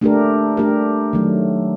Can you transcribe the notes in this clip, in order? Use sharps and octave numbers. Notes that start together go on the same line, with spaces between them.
A3 D4 G4 A#4
A3 D4 G4 A#4
D#3 F#3 A3